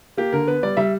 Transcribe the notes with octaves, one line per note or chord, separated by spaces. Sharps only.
A#3 G4
D3 A#4
B3 B4
G3 D5
G3 E5